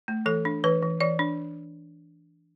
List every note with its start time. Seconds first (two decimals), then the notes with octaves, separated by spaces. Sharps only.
0.08 A3
0.26 E3 A4
0.45 D4
0.64 E3 B4
0.82 E3
1.00 E3 D5
1.19 D4